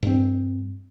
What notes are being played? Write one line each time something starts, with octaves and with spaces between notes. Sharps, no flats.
G2 C4